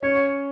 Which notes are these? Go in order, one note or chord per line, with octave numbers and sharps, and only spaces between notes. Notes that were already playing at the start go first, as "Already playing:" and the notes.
C#4 C#5